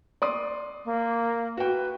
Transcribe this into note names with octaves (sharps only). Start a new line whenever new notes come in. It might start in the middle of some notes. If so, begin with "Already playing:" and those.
D5 C6 D#6
A#3
F#4 B4 G5